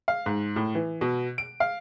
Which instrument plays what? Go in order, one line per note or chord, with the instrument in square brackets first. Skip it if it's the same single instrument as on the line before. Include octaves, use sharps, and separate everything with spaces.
[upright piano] F5
G#2
A2
E3
B2
D7
F5